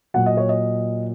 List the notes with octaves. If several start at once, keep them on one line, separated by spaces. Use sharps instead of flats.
A#2 F#3 F#5
D#5
C#5
D#5